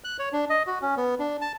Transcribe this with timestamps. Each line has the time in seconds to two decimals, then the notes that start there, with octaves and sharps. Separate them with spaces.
0.04 F#6
0.19 C#5
0.33 D4
0.50 D#5
0.67 F#4
0.82 C#4
0.97 B3
1.19 D4
1.41 A5